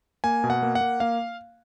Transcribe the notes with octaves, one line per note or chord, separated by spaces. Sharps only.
A#3 G#5
B2
F#5
A#3
F#5
A#3
A#3 F5